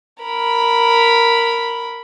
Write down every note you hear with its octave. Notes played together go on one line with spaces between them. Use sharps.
A#4 B5